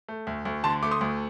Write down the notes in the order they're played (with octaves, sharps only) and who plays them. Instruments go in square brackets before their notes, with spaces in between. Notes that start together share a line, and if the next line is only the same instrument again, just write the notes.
[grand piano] A3
D2
D2
D3 A5 C6
A3 D6
C6 D#6
D2